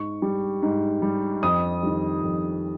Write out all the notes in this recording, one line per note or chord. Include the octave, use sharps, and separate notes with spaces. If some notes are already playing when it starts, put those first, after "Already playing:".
Already playing: G#2 C#6
G3
G#2
G3
F2 D#6
D#3 G3
F2